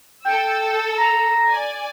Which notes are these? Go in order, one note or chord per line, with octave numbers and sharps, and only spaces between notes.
A4 G5 E6
A#5
D5 G#5